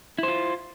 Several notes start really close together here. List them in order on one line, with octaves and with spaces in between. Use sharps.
E4 C5 F4